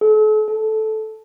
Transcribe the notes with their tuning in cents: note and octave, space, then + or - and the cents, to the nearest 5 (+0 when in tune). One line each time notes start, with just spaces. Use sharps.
A4 -40
A4 -10